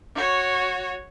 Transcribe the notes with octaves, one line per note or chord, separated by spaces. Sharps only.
F#4 C#5